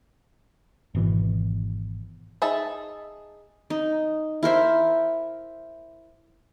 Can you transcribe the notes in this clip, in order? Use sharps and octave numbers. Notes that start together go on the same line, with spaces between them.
G#1 B2 E3
D#4 G#4 E5 A5
D#4
E4 A#4 C5 E5